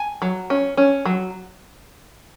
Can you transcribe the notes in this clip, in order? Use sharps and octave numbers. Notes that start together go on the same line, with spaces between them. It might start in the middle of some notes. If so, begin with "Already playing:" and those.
Already playing: G#5
F#3
C#4
C#4
F#3